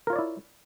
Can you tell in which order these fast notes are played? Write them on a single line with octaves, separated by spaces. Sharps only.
A#4 F4 C#5 D5 E4